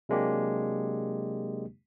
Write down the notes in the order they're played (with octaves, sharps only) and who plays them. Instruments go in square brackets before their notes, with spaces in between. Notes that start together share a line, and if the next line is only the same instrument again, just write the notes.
[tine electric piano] C3 F#3 G#3 A#3 D4 G4